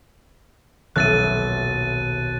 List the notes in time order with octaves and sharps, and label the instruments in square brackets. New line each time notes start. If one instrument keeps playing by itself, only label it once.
[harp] D#1 B1 E4 [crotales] F#6 A6 D#7